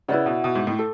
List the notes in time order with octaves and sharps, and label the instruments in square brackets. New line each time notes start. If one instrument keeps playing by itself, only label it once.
[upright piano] C#3 [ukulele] E4 B4 D5 F#5
[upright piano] B2
B2
G#2
A2
[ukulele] A4